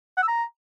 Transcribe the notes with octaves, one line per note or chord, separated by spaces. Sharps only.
F#5
E6
A#5